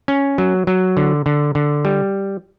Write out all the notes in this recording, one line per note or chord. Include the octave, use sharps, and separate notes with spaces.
C#4
F#3
F#3
D3
D3
D3
G3